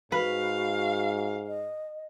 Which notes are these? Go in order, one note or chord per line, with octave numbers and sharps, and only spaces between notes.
G#2 F#4 B4 F5
D#5